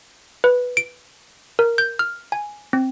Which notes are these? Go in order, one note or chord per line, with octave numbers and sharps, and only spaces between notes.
B4
D7
A#4
G6
F6
G#5
C4